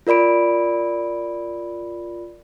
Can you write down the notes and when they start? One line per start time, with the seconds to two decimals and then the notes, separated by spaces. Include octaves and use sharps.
0.07 F4 A#4 D5 B5 D7